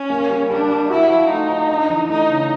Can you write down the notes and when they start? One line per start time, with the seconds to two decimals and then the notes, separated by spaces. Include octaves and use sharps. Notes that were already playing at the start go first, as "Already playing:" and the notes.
Already playing: C#4
0.10 A#3
0.30 G3
0.50 G3 D4
0.70 G3
0.90 E4 F#4
1.10 F3
1.29 A3 D#4
1.49 F3
1.69 D4
1.90 E3
2.09 A3 D#4
2.29 C#3